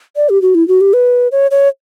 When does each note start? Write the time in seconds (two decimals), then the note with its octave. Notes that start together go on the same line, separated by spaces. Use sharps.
0.16 D5
0.29 G4
0.42 F#4
0.55 E4
0.68 F#4
0.81 G4
0.93 B4
1.32 C#5
1.51 C#5